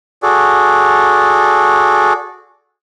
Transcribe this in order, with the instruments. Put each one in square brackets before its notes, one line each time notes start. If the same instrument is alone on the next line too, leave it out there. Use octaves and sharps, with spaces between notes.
[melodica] F#4 G#4 A4 D5